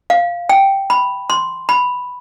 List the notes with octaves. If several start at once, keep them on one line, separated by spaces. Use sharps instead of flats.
F5
G5
B5
C6
B5